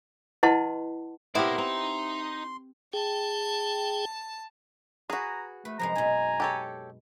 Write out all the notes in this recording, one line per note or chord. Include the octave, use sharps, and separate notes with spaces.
E4 B4 D#5 F#5 A5 C6
B3 C4 E4 G4 A#4 D5 C6
C4 D#4 A#5
G#4 G5 A5
F#4 G#4 B4 F5 A#5
A3 B4
F#2 C3 F3 G#3 A#5
B2 D#4 G#5
G4 A4 C#5